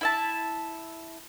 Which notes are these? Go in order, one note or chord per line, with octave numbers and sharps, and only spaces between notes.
E4 E5 A5